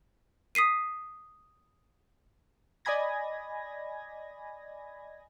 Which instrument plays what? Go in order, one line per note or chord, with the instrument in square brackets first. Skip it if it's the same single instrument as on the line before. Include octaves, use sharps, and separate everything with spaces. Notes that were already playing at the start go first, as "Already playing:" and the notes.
[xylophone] D#6 B6 C7 D#7
[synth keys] D5 D#5 G#5 B5 G#6 A#6